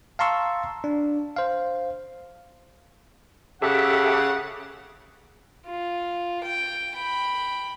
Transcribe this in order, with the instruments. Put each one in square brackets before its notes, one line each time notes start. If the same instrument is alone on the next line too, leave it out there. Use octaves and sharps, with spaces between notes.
[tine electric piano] F5 A5 A#5 C6 C#6 E6
D4
C5 F5
[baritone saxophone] C#3 [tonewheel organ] G4 A4 E5 [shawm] F#5
[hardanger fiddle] F4
G5
G5 B5